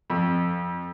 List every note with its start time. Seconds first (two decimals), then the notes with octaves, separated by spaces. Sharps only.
0.10 F2